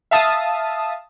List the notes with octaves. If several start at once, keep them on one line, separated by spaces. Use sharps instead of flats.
E5 F5 A5 D#6